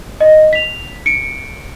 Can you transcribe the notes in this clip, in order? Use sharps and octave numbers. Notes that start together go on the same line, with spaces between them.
D#5
B6 F7
C#7 D7